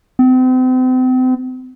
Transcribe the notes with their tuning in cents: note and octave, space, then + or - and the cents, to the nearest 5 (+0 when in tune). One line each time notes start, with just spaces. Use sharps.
C4 -40